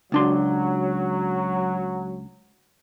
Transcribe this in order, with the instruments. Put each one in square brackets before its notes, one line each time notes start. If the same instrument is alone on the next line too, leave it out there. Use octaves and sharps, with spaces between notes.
[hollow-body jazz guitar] C#2 D4 C6 [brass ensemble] F#3